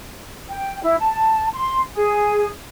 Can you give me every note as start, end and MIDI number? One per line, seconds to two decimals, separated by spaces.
0.49 0.82 79
0.83 0.95 64
0.98 1.46 81
1.54 1.80 84
1.93 2.48 68